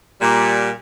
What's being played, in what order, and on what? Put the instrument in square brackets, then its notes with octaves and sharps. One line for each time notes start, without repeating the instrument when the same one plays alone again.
[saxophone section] A#2 G3